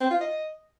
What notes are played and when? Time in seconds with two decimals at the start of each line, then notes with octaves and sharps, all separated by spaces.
0.01 C4
0.11 F4
0.21 D#5